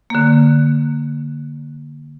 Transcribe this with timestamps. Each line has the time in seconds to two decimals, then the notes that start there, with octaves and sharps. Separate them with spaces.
0.10 D3 A#3